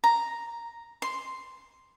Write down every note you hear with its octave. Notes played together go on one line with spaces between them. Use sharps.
A#5
C6